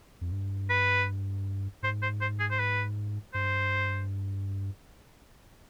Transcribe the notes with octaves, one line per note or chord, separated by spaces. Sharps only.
F2
G2
B4
G#2 C5
C5
C5
G#4
C5
B4
G2 C5